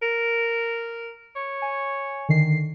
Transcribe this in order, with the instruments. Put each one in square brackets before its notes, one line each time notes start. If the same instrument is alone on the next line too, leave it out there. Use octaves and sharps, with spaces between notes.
[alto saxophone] A#4
C#5
[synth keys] G#5
D3 D#3 C7